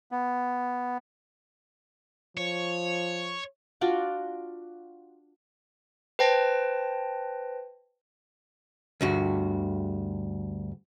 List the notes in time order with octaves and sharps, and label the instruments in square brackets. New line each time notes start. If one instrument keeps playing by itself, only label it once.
[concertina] B3
[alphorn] F3 [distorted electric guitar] C#5
[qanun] D4 F4 F#4 D5
[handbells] B4 C5 G5 A5 A#6
[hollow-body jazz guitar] D2 G2 F#4